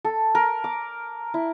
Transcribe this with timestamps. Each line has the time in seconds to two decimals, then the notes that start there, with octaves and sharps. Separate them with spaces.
0.05 A4
0.35 A#4
0.64 D6
1.34 E4